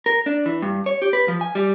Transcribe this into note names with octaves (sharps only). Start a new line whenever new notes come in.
A#4
D4
E3
G2
C#5
G4
B4
F3
G#5
G3